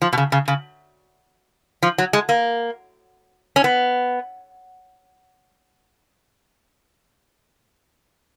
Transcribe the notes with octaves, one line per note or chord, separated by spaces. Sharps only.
F3
B2
C#3
C#3
C#3
F3
F#3
G#3
A#3
C#4
B3